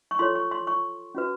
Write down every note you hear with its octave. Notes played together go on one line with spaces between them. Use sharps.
C#6
F4 A4 C#5 C6
C#6
C6
C#6
C#4 F#4 B4